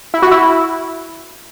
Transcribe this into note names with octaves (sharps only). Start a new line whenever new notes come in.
E4
F#4
E4